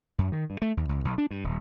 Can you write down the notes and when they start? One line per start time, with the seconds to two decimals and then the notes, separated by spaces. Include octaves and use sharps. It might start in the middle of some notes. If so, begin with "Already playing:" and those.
0.18 F#2
0.32 D#3
0.50 G2
0.62 A3
0.77 D#2
0.89 C#2
1.05 B1
1.18 D4
1.31 G2
1.44 D#1